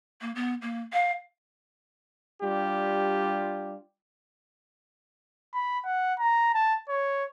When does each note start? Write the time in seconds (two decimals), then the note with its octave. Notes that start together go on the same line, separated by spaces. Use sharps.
0.21 A#3
0.35 B3
0.62 A#3
0.93 F5
2.42 G3 D4 F4 G4
5.54 B5
5.85 F#5
6.19 A#5
6.54 A5
6.88 C#5